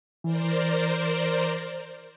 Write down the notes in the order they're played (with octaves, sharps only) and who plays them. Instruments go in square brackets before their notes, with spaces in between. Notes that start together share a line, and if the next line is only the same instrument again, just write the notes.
[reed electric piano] E3 [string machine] A#4 C5 D5